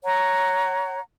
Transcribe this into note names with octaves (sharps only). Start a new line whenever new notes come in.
C#5 F#5 A#5